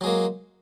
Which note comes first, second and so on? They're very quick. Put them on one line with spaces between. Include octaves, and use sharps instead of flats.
F#3 G#3 A#3